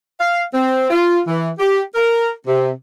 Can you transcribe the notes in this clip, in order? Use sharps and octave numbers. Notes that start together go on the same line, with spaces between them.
F5
C4
F4
E3
G4
A#4
C3